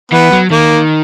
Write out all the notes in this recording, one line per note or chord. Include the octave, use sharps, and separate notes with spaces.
E3 B3
F#3
D#3 A#3